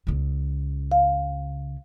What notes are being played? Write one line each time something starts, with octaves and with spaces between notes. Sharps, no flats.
C#2 C#3
F5